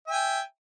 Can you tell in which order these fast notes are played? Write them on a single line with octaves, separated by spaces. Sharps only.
E5 G#5 G5